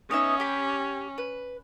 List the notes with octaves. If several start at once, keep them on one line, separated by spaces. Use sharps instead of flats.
B3 C#4 D#4 E5
G4 B5
B4